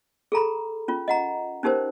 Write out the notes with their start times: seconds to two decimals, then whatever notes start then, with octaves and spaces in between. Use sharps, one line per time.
0.32 G#4 A4 A#5 B5
0.88 C#4 F4
1.08 D#5 F#5 A#5
1.63 C#4 D#4 G4 A#4 C5